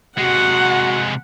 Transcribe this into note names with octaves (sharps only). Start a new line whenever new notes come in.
C3 G#3 F#4 F#5